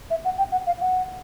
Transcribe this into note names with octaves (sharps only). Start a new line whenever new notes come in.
E5
F#5
G5
F#5
F5
F#5